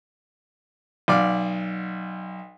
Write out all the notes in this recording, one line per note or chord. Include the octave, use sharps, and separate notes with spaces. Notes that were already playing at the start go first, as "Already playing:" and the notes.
B1 D5 F5